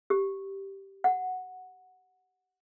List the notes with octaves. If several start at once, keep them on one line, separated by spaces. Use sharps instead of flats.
G4
F#5